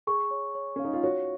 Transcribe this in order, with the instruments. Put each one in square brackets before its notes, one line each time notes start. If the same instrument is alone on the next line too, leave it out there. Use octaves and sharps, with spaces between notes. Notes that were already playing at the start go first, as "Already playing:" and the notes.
[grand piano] G#4 [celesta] C#6
[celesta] C#5
C#5
[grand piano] C#4 [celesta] F5
[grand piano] D#4
F4
[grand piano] F#4 [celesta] C#5